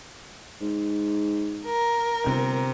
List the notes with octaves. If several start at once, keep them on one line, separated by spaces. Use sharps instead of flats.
G#2
A#4
G1 C3